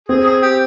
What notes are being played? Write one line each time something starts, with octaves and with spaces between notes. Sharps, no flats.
C4 G#4
G#4
G4